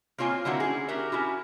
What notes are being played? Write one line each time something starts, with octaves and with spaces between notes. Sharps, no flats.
A#3 C4 F4 C#5 G#5
D3 A#3 C4 E4 F#4
C#4 G#4
F#4 G4 A#4 E5
C#4 E4 F#4